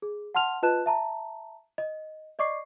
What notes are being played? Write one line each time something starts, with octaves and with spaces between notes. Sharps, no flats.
G#4
F#5 A5 C6 F6 F7
F4 B4 D#5 A5 F#6 E7
E5 A5 A#5
D#5
D5 D#5 C#6 D6 C7